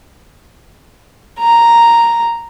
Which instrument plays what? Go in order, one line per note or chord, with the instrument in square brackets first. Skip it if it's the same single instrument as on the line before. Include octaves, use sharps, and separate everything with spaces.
[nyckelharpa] A#5